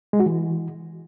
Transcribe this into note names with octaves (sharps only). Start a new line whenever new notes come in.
G#3
F#4
E3